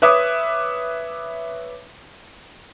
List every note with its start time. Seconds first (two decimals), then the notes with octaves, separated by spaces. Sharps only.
0.02 B4 C#5 E5 D6 D#6